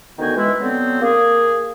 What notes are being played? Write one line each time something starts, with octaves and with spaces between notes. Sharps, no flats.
D2 D#3 B3 F#4 G5 G#5
E3 G#3 E4
D3 F#3 B3 C4
A#3 G#4